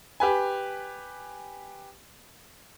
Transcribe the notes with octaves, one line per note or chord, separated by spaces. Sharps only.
G4 B4 G#5